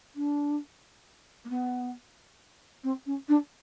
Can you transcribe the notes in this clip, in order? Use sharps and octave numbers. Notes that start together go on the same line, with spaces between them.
D4
A#3
B3
C4
C#4
D4